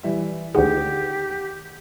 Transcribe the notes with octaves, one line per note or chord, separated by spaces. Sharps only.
E3 G3 E5
D2 D#3 G#3 G4 F#5